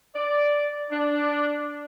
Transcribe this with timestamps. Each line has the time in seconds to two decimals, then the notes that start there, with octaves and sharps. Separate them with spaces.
0.15 D5
0.90 D4